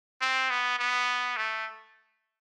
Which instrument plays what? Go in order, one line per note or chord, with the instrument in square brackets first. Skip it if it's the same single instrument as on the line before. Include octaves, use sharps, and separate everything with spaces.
[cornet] C4
B3
B3
A3